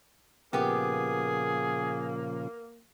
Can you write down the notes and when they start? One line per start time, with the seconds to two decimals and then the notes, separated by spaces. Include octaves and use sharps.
0.53 A#2 C#3 F3 A#3 B3 G4 G#4